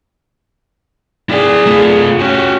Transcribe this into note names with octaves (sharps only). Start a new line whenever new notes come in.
E4 G#4 D5
A3 F4
C#4 F#4 G4